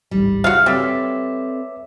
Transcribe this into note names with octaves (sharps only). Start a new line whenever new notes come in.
A1 D2 G#2 G3
C#3 F#4 E5 F5
G3 C4 A4 B4 C#5 E5 D6